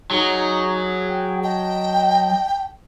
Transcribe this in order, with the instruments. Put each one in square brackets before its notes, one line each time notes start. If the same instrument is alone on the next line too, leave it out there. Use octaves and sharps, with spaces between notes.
[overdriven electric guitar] F#3 [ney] D#4 [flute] G#4
[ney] G5
[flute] D#5 [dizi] G5 [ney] A5